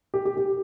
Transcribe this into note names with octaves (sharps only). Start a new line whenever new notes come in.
G4
G4
G4